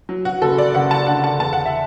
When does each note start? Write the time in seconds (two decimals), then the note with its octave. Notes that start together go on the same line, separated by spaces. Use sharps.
0.09 F#3
0.25 F#4
0.42 F#1 A4
0.58 D5
0.74 F#1 F#5
0.91 A5
1.07 D3 F#5
1.24 A5
1.40 E2 A5
1.53 F#5
1.65 E5